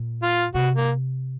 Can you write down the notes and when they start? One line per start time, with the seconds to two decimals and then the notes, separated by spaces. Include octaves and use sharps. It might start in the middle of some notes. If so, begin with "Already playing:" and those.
Already playing: A#2
0.23 F4
0.54 C3 F#4
0.75 A#3